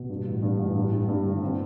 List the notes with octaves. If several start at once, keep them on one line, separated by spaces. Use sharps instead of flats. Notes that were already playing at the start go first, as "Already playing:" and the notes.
Already playing: B2
G2
A1
G2
A1
G2
G2
G2
D3
C4